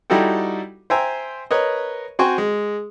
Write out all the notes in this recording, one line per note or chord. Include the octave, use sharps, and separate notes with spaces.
G3 D#4 E4 F#4 A4 G5
C5 E5 G5 G#5 A#5 E6
A#4 B4 C#5 D#5
C4 F#4 C5 G5 G#5 C#6
G#3